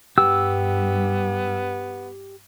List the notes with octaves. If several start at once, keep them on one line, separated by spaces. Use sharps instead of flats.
G2 B3 G4 E6